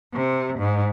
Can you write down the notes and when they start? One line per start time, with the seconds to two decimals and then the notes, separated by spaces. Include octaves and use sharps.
0.13 C3
0.58 G#2